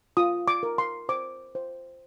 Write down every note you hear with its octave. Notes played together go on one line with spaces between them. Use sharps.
F4 D#6
D6
A#4
C6
C5 D6
C5